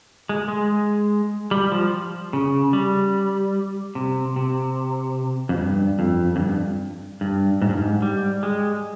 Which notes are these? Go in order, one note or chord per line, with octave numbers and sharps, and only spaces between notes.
G#3
G#3
G3
F3
C#3
G3
C3
C3
F2
G2
F2
F2
G2
G2
G#2
G2
G#2
G3
G#3